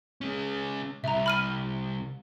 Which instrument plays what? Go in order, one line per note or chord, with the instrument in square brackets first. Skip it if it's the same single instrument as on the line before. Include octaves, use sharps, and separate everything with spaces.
[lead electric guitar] G#3 C#4
[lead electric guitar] C2 [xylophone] E5 A#5
[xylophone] B5 F6 D#7